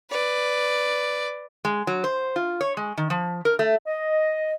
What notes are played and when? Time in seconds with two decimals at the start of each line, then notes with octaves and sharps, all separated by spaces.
0.10 B4 D5
1.65 G#3
1.87 F#3
2.04 C5
2.36 F4
2.61 C#5
2.77 G#3
2.97 D#3
3.10 F3
3.45 A#4
3.59 A3
3.86 D#5